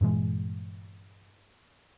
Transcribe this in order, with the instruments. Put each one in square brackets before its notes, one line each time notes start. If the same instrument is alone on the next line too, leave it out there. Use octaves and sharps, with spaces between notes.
[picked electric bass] G2 A#2 E3 G#3